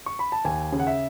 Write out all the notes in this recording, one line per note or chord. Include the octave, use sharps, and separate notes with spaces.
C#6
B5
A5
D#2 G#5
C#3
F#5
E5